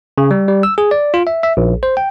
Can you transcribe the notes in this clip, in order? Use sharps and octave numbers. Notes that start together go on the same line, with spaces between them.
C#3
G3
G3
E6
G#4
D5
F4
E5
E5
A#1
C5
G5